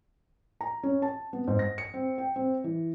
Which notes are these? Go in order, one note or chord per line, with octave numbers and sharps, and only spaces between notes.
A#5
C#4
A5
B3
G#2
A#6
C#7
C4
G5
C4
E3